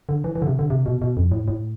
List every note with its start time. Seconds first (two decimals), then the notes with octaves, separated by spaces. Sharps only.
0.09 D3
0.24 E3
0.35 E3
0.42 D3
0.47 C3
0.59 D3
0.70 C3
0.86 B2
1.02 B2
1.17 F2
1.32 A2
1.48 A2